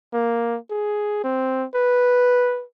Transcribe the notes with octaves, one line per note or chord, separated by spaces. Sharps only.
A#3
G#4
C4
B4